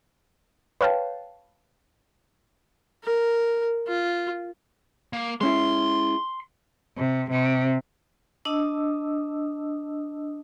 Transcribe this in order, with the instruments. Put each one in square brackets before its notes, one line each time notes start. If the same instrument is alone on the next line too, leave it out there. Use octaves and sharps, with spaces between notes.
[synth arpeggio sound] B4 C#5 F5 G5 A5
[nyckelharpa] A#4
F4
[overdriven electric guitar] A#3
[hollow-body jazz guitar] G#3 C#4 E4 [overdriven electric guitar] C6
[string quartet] C3
C3
[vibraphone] D4 D#5 A5 D#6 E6